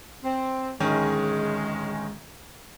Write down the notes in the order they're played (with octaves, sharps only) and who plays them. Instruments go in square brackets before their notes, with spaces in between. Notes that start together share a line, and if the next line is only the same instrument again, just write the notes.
[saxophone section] C4
[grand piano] D1 D#3 C#4 [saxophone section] G#3